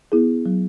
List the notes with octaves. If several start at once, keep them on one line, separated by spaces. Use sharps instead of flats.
B3 E4 G#4
F#3